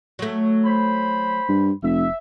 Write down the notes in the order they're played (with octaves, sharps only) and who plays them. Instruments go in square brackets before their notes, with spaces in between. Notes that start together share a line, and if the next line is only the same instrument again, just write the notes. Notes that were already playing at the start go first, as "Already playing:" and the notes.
[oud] F#3 A3
[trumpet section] C5 B5
[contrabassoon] G2
[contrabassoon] F1 [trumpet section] E5